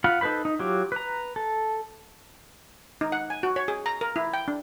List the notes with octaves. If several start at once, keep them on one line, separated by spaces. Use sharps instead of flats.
F4 F5 F#5 B5
D#4 A4 B4 C5 B5
D#4
F#3 F4 G4
B4 A#5
A4
D#4
F#5
G#5
F#4
C#5
G#4
A#5
A#4
E4
G5
D4